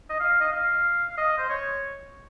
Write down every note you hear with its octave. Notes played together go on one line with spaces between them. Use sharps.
D#5
F5
D#5
F5
D#5
C5
C#5